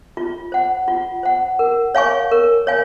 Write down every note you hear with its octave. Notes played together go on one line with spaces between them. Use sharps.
F4
C5 F#5
F4
C5 F#5
A#4
C#5 F5 G#5 C#6
A#4
C#5 F5 G#5